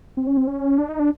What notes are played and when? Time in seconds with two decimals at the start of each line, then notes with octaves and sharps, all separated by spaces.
0.17 C4
0.27 C#4
0.37 C4
0.47 C#4
0.78 D4
0.89 D#4
0.99 D4